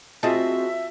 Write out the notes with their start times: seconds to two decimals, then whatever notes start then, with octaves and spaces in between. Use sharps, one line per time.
0.23 C4 F4 F#4 G#4 D#5 E5 A5